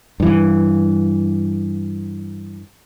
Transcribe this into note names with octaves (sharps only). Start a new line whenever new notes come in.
G2 E3